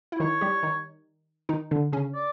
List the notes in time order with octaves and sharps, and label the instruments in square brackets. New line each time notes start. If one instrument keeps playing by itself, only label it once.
[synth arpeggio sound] E4
[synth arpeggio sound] D#3 D#4 [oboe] C#5
[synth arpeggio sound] G3 G4
D#3 D#4
D#3 D#4
D3 D4
C#3 C#4
[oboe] D5